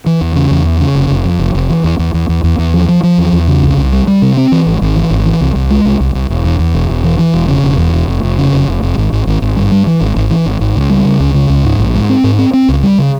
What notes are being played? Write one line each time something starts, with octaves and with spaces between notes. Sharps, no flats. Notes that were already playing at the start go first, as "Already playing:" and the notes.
E3
E2
C#3
E2
E3
C#3
F1
F1
F2
F1
F1
E3
E2
E2
E2
E2
E2
E2
F3
F3
F3
E2
E2
C#3
C2
C2
G3
G3
C3
C4
E3
G#1
G#1
E3
G#1
E3
C2
C2
G#3
C2
C2
C2
E1
E2
E2
E1
E1
E3
E3
E1
C#3
E1
E2
E1
F1
F1
C#3
F1
F1
F1
G#1
G#1
G#1
G#1
G2
G3
E3
G#1
G#1
E3
G#1
G#1
C#2
G3
C#3
C#2
C#3
C#2
G#2
A#1
G#2
C4
G#2
C4
C4
C#2
G3
C#3